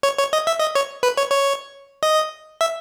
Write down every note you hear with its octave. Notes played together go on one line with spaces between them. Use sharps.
C#5
C#5
D#5
E5
D#5
C#5
B4
C#5
C#5
D#5
E5